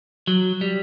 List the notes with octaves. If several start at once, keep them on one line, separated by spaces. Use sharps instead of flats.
F#3
G3